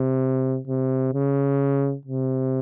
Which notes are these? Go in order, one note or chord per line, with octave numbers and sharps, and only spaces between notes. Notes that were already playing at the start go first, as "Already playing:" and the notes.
Already playing: C3
C3
C#3
C3